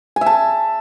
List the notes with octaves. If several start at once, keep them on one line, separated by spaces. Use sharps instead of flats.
G#5
E5
A5